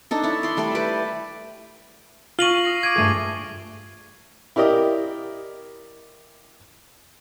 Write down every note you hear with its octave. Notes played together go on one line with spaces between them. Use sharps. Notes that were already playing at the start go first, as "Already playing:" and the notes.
D4 D#4 A4
E4 C#5
D5 C6
G3 A3 A4 D5
G4 B4 D6
F4 C#6 A#6 C7 D#7 F#7 G7
D#6 A#6 C7
D6 G#6 D7 D#7
G2 A3 G#4
E4 G4 A#4 D5 D#5